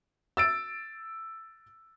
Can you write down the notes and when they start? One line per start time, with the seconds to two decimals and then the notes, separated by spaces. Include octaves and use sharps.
0.37 E6 A6 D7